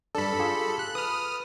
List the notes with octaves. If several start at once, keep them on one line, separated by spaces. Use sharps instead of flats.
G2 D4 A4 B5
F4 G4 G#4
F#6
B4 D#6 F6